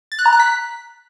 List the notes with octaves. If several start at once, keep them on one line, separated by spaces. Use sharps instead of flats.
A6
F#6
A#5
F#6
B6